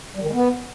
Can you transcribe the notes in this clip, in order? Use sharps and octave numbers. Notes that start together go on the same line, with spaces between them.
G3
D#3
G#3
B3